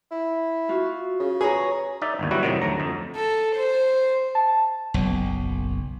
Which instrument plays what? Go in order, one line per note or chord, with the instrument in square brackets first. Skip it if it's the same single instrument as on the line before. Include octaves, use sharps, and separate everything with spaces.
[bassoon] E4
[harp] F4 F#4
[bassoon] C#3
[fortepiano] G#4 [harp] B4 C#5 A#5
[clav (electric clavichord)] D#4 D5 E5
G1 D#2
F#3 G3 E4 F#4 B4
F2 A2 C3 D#3 F#3
D2 F#3 A#5
F2
[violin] A4
C5
[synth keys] A5
[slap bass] F#1 B1